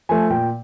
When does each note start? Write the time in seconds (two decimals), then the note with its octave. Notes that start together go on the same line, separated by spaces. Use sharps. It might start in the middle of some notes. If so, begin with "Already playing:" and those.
0.09 F3 A3 G#5
0.30 A#2 G5